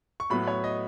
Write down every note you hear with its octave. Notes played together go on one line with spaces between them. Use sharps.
C#6
A2 F#3 B3 B5
C#5
D#5